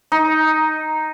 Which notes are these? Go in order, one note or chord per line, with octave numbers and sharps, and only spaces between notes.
D#4